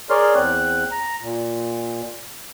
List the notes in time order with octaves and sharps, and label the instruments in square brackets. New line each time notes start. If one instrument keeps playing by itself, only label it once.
[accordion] G#4 A#4 C#5 D5 C6 F6
E2 C4 F#6
A#5
A#2